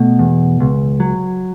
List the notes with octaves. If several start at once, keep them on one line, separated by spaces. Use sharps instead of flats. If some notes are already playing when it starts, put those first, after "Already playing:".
Already playing: B2 A3
E2
C#2
F#3